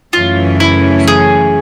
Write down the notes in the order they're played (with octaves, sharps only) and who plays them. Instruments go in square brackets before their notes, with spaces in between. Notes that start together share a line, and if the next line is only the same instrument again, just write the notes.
[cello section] F#2 C#3 E3 A3 C#4 [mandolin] F4
[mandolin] E4
G#4